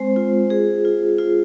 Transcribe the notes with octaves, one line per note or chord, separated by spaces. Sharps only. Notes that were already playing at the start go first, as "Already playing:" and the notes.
Already playing: G#3 C4 C5
F4
G#4
F4
F4